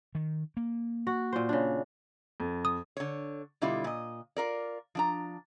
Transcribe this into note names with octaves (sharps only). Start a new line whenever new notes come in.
D#3
A#3
F#4
A#2 C5
C#3 D4
F2
D#6
D3 C#5
B2 D3 G3 E4 F4
A#2 D#5
F4 A#4 D5
F3 D4 A#5